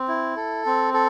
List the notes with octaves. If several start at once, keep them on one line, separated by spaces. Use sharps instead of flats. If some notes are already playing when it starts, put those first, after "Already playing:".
Already playing: C4
E4
A4
C4
A4